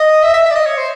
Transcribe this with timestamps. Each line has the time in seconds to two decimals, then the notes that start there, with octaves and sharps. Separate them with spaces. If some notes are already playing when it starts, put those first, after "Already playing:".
Already playing: D#5
0.23 E5
0.34 E5
0.46 E5
0.51 D5
0.56 D#5
0.66 C#5
0.77 C5